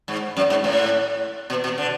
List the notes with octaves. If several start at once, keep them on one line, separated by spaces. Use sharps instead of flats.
G#2
F#2
G#2
A2
B2
B2
D3